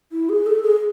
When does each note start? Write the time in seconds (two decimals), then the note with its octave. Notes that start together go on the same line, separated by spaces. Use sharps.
0.12 E4
0.29 G#4
0.46 A4
0.63 G#4